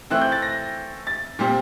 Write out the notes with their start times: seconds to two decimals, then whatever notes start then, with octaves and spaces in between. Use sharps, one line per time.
0.10 E3 A3 C4 F#6
0.22 G6
0.32 A6
0.42 A#6
1.07 A6
1.39 A#2 G3 C4